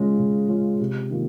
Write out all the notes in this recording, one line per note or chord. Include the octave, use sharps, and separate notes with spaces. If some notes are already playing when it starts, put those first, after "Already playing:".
Already playing: C#3 G#3 C#4 F4
C#3
G#3 C#4 F4
C3
D#3 A#3 F4